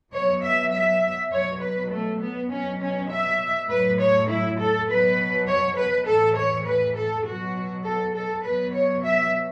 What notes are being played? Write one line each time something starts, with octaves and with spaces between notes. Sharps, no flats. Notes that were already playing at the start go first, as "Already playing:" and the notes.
B2 F#3 C#5
E5
E5
B2 F#3 C#5
B4
A3
B3
B2 F#3 C#4
C#4
E5
A2 F#3 B4
C#5
E4
A4
B2 F#3 B4
C#5
B4
A2 E3 A4
C#5
B4
A4
B2 F#3 F#4
A4
A4
B2 F#3 B4
C#5
E5